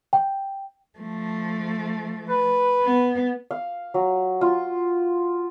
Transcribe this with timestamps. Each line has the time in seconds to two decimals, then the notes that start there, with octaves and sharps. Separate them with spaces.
0.13 G5
0.99 F3 A3
2.29 B4
2.83 B3
3.51 F5
3.94 F#3
4.41 F4